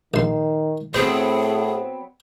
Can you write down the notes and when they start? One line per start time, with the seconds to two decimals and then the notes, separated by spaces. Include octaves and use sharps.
0.14 A#1 D#3 C6
0.94 A2 F#3 B3 C4 G#4 C5